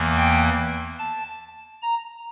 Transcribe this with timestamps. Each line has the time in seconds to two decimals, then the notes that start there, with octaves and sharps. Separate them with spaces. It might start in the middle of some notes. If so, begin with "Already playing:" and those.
Already playing: E2 E3 A#3
0.17 G5
0.99 A5
1.82 A#5